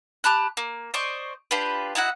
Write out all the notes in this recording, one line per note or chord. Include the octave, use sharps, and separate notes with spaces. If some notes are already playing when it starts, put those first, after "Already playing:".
G4 A5 B5 F#6
A#3
C5 D5 D#5 C#6
D4 F4 G4 B4
D#4 E4 F#4 F#5